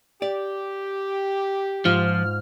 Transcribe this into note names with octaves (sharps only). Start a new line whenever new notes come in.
G4 D5
G#2 F3 F4 F6